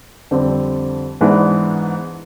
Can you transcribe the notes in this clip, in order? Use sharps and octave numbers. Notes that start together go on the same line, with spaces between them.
F2 D3 G3 C4
G#2 E3 G#3 B3 D4